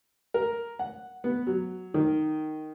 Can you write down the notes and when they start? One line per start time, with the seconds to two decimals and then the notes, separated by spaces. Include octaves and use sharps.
0.34 A#4
0.79 F#5
1.24 B3
1.47 F#3
1.94 D#3